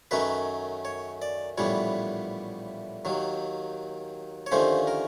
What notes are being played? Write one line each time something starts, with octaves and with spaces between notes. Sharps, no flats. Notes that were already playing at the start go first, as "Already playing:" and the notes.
F#2 D#3 F#3 A3 C#4 B4
C#5
D5
A#1 A2 E3 G3 B3 C#5
D#2 D#3 F#3
C#5
D#2 D3 F3 A3 C#4 C5
A#4